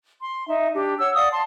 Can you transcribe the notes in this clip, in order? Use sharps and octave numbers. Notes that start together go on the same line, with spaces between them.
C6
D#4 E5
D4 G4
C#5 F#5 E6
D5 F5 F#5 D#6
A5 C6